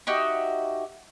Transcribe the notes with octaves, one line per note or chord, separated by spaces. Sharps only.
D#4 F#4 G4 E5